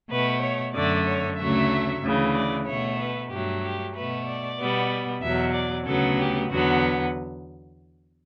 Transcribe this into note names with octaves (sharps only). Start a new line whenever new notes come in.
B2 A3 B4
C#5
F#2 D3 A3 D5
C#5
D2 C#3 F#3 A3 E5
D2 C#3 E3
D5
B2 A3 C#5
B4
G2 F#3 A3 G4
G4
B2 A3 B4
D5
B2 G3 B3
E2 B2 F#3 E5
D5
D2 C#3 F#3 B3 A4
G4
E2 D3 F#3 B3 F#4